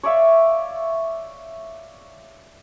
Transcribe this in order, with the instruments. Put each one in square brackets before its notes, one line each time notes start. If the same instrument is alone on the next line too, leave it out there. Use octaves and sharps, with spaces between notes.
[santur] C#5 D5 E5 F5